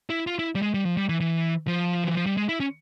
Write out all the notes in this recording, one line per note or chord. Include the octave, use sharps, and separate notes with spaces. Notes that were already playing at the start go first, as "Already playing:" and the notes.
E4
F4
E4
G3
G#3
G3
F3
G3
E3
E3
F3
E3
F3
G3
G#3
E4
C#4